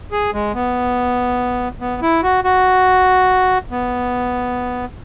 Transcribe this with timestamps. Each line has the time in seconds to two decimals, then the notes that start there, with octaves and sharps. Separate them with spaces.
0.12 G#4
0.33 G#3
0.54 B3
1.81 B3
2.02 E4
2.23 F#4
2.44 F#4
3.71 B3